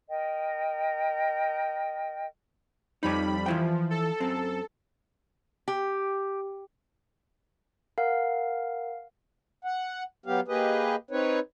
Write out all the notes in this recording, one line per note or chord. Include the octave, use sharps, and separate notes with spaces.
A#4 D#5 G5
F2 G3 D#4 C#5 B5
E3 F3 E4 G5
A4
F#2 C4
G4
A#4 F5 F#5 F6
F#5
F#3 B3 G4 F5
A#3 G4 G#4 B4 D#5
C4 D#4 B4 C#5